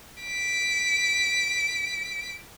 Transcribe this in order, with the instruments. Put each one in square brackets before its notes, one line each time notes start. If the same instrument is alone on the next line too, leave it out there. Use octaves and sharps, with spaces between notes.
[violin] B6 D7